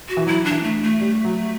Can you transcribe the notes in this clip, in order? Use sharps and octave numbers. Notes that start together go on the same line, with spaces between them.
F#4
E3
F#3 E4
D4
E3
A3
A3
G3
F#3